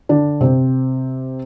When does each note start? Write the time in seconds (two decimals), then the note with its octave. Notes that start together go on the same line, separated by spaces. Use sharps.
0.09 D3 D4
0.41 C3 C4